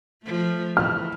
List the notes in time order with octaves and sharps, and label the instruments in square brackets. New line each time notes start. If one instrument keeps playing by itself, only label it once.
[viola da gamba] F3 A3
[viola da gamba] E3 [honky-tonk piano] F6